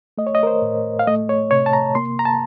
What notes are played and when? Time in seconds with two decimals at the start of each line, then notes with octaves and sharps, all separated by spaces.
0.18 A3 D#5
0.27 C#5
0.35 D#5
0.43 A#4
0.47 C5
0.62 A2
0.99 F5
1.07 A3 D#5
1.29 C#5
1.51 C3 C#5
1.66 A5
1.73 A#5
1.95 A#3 C6
2.19 A#5
2.25 A5